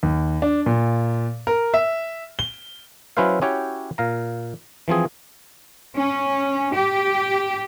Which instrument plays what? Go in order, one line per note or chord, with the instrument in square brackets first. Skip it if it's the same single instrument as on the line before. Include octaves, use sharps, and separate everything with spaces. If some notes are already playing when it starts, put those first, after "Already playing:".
[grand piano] D#2
D4
A#2
A#4
E5
G7
[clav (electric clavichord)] F#3 C#4 E4 B4 C5 F5
C#4 E4 F#4 G4 C#5 G5
A#2 F5 A#5
E3 F3 C4 G#4
[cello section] C#4
G4